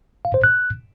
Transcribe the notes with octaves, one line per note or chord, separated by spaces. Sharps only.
F5
C5
F#6